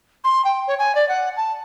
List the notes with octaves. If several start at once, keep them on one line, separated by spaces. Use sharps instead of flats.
C6
G5
C#5
G#5
D5
F#5
A5